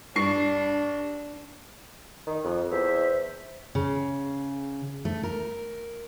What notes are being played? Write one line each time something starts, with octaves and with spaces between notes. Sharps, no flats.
G2 D4 C#6 C7
D#3
F2
E2 C5 E5
C#3
A3
A#4